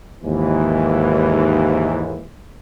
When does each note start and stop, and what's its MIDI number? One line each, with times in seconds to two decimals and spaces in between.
0.24 2.24 39
0.24 2.24 44
0.24 2.24 52